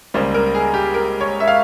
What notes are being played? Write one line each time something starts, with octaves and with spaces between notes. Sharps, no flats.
C#2 C#3 G3 A#3 C5
A#4
G#4
G4
A#4
C#5
E5
F5